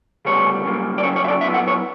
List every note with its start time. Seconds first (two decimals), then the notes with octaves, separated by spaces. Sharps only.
0.25 D2 C#3 G3 B3 C#5
0.64 F#2 C#3 G3 A#3
0.98 D5
1.03 F#2 C#3 F#3 C#4 C#5
1.16 C#5
1.24 E5
1.28 D5
1.41 A#2 F#3 B3 E4 E5
1.54 F#5
1.68 C#5